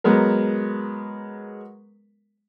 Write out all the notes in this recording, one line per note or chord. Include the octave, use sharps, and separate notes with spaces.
F#3 G#3 B3 A#4